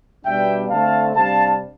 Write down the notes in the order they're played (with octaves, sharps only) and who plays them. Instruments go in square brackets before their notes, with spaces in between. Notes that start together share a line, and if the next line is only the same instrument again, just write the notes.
[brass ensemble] B2 G3 B3 D4 E5 G5
D3 A3 C4 F5 A5
C3 G3 D4 F5 A5